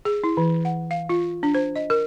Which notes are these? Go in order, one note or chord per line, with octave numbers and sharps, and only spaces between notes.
G#4
E4
E3
F#5
F5
F4
D4
C5
D#5
A#4